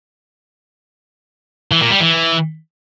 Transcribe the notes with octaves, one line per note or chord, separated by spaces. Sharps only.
E3
A#2
G3
E3